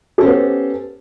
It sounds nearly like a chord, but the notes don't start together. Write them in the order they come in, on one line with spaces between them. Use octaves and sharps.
A4 C#4 C5 B3 G4